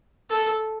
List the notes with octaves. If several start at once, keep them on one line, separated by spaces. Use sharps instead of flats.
A4